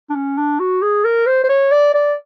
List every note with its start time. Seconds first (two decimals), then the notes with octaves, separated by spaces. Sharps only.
0.10 D4
0.15 C#4
0.38 D4
0.59 F#4
0.82 G#4
1.05 A#4
1.26 C5
1.44 C5
1.49 C#5
1.72 D5
1.94 D5